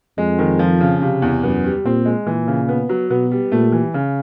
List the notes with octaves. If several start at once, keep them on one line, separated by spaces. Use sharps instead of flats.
F2 G#3
D#3
F3
C#3
C3
E2
F#2 B3
G3
A#2 C4
G#3
A#2 E3
C#3
B3
F#3
B2 B3
G3
A#2 A3
E3
C#3